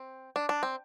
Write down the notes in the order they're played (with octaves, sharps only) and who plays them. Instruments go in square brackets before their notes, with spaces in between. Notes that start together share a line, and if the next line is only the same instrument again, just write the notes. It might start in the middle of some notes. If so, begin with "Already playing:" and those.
Already playing: [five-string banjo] C4
D4
D4
C4